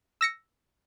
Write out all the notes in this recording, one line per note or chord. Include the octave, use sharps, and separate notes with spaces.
E6 A#6 C#7